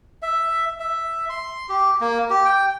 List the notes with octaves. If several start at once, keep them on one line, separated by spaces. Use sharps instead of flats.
E5
E5
C6
G4
A#3
G4
G5